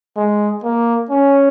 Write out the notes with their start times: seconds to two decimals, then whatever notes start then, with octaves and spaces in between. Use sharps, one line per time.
0.17 G#3
0.64 A#3
1.10 C#4